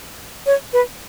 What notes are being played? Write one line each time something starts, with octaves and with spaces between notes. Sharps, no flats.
C#5
B4